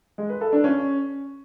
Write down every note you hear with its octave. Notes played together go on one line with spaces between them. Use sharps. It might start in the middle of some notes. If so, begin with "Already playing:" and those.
G#3
B4
A4
D4
C#4